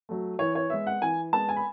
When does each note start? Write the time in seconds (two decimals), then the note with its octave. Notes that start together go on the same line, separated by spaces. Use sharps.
0.09 F#3 A3
0.39 E3 C#5
0.55 C#5
0.70 G#3 B3 E5
0.87 F#5
1.02 E3 G#5
1.33 G#3 B3 A5
1.49 G#5
1.56 B5